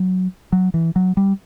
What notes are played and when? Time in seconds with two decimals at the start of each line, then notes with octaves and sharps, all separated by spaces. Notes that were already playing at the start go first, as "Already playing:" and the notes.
Already playing: F#3
0.52 F#3
0.74 E3
0.96 F#3
1.17 G3